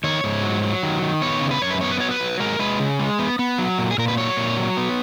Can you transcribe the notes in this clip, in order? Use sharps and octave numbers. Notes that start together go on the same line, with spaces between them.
D#3 C#5
G#2
F#3
F#3
D#3
D#3
B3 C#5
C#3
B4
F#2 C#5
B4
B3 C#5
B4
F#3 C#5
B4
F#3
G#3 A#4
G#3 B4
C#3
G#3
B3
B3
F#3
A#2
G#4
A#2 A#4
B4
F#3 C#5
A#2
F#3
B3